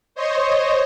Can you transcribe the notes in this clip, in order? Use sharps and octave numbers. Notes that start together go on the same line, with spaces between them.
C5 C#5 D#5